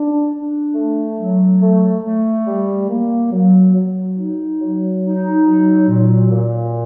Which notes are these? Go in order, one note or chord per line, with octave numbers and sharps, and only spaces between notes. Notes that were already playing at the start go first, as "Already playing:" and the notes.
Already playing: D4
D4
A3
F#3
A3
A3
G3
A#3
F#3
F#3
D#4
F#3
D#4
F#3
A#2
A#2